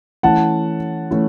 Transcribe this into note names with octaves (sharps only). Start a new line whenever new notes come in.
E3 A3 C#4 E4 F#5 A5
E3 A3 C#4 E4